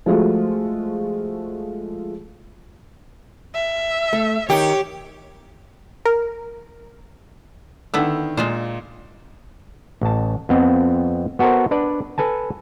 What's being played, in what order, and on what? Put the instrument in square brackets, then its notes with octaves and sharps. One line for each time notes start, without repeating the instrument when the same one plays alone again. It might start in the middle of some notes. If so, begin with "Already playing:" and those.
[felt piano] F3 G#3 A3 F4 F#4
[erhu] E5
[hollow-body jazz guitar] A3
[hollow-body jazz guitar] D#3 [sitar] G4 [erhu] C#5
[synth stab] A#4
[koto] D3 B3 E4 [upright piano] D#3 E6
[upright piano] A#2 [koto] G#3 F4 C5
[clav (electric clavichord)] A1 A5
F2 B3 C4
B3 F#4 A4 A#4 C5
D4 B4 D5
A4 B4 G#5 A5